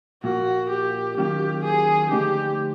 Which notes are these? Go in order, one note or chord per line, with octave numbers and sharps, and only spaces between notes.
A#2 F3 A#3 F#4
G4
D#3 F#3 A#3 C#4 F4 G4
G#4
D3 F3 A3 C4 D#4 G4